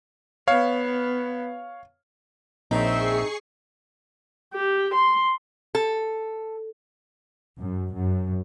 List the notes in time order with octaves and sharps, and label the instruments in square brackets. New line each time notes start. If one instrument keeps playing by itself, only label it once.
[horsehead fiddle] B3 [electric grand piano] C#5 F5
[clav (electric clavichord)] A#1 C#5 [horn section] C4 E5 [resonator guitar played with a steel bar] D#4 [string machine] G#4 C#6 C7
[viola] G4
C6
[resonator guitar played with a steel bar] A4
[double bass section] F#2
F#2